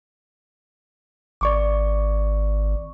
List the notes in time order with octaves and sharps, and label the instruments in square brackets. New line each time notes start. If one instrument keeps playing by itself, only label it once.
[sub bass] G#1 [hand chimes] D5 C#6 D6